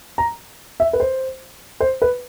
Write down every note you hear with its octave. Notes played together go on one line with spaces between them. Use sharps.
A#5
E5
B4
C5
C5
B4